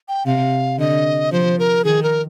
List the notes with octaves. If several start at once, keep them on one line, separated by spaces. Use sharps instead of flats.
G5
C3 F5
D3 D#5
F3 C5
A#4
D#3 G#4
A#4